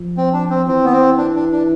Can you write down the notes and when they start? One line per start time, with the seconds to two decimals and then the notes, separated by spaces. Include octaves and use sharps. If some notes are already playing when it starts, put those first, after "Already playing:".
Already playing: F3
0.17 C4
0.33 D4
0.50 C4
0.68 E3 C4
0.85 B3
0.92 C4
1.18 D4
1.36 D4
1.52 D4